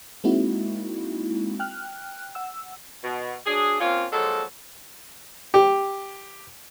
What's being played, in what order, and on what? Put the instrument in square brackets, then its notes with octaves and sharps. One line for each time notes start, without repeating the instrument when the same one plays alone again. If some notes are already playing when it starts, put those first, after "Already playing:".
[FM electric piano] G#3 A#3 C4 D#4 E4 F#4
G5 F6 F#6
F#5 E6
[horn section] B2
F#3 D4 G#4
A#3 C4 C#4 F4
A#2 F3 F#3 G#3 A4
[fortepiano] G4